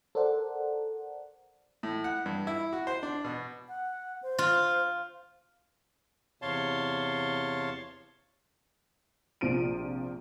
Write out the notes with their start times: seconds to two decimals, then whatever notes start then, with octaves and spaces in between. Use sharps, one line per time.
0.15 A4 A#4 C5 D5 F#5
1.83 A2
2.04 F#5
2.26 G2
2.47 E4
2.73 F#4
2.87 C5
3.03 D4
3.24 B2
3.68 F#5
4.23 C5
4.39 F4
6.42 E2 C3 C#5 F5 A5 C6
9.41 A#1 C3 F3 D7 D#7